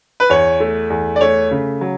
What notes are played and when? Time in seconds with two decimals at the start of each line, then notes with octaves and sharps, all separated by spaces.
0.20 B4
0.29 E2 C#5
0.60 A3
0.90 E2
1.16 D5
1.21 A3 C#5
1.51 C#3
1.81 F#3